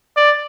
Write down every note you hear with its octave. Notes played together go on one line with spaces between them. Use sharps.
D5